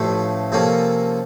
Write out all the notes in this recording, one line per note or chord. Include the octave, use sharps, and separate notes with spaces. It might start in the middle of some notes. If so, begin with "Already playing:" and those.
Already playing: A1 A2 F3 A3
C3 F3 A#3 C#4 A4